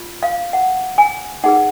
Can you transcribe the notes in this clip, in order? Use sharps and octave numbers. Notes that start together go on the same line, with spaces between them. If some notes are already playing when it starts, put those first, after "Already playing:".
Already playing: F4
F5
F#5
G#5
D#4 G#4 B4 F#5